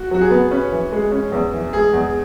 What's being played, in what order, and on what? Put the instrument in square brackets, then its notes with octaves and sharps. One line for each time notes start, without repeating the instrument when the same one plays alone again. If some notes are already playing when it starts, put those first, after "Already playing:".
Already playing: [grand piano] F#4
[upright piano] F#3 [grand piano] F#4
[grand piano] G#4
[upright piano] B3
[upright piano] C#4 [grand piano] B4
[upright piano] E3
G#3
C#4
E2
E3
[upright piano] G#3 [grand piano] G#4
[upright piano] E2